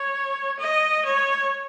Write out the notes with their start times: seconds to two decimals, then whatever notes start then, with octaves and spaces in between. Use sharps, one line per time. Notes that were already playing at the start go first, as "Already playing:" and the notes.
Already playing: C#5
0.59 D#5
1.05 C#5